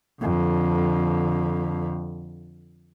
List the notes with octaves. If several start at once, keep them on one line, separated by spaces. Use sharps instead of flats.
F2 D3